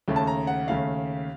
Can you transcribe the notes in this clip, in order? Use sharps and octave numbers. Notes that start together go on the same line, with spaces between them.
D#2 C#3 A3
A5
A#5
F#5
D#2 C#3 A3 F5